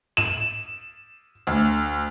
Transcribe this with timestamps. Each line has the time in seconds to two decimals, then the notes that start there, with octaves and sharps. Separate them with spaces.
0.17 E7
1.47 D2